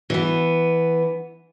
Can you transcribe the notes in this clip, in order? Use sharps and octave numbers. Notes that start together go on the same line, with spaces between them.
E3 B3